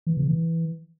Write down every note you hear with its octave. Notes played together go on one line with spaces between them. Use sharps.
E3
C#3
E3